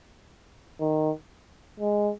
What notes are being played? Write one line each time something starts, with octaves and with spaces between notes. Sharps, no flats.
D#3
G#3